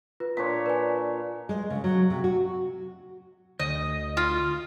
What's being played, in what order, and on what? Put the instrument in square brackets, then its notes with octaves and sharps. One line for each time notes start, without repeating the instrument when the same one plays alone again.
[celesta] F4 B4
[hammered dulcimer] A#2 D4 C#5 [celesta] B6
[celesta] B4 G#5
[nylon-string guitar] G#3
C#3
F#3
C3
F#4
[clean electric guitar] D2 [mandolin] D#5
[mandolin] F4